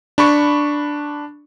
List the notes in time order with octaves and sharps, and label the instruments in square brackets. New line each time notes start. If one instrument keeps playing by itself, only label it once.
[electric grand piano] D4 B5 C#6